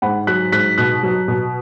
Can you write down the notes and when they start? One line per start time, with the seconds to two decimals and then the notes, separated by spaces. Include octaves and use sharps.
0.02 G#2 F#5 B5
0.27 F#3 F#6 B6
0.52 G#2 F#6 B6
0.78 B2 F#6 B6
1.03 F#3
1.28 B2